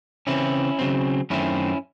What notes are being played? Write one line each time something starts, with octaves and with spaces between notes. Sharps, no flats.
C#3 E3 C4 C#4 E4
C#3 F#3 C4
F#2 D#3 A3 C4 C#4 E4